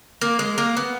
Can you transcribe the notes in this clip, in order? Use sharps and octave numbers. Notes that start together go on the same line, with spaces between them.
A#3
G#3
A#3
B3